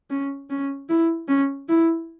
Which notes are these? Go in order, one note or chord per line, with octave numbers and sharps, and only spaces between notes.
C#4
C#4
E4
C#4
E4